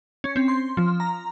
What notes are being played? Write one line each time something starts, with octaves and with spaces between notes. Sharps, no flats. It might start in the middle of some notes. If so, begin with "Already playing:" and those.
C#4
C4
C6
F3
A#5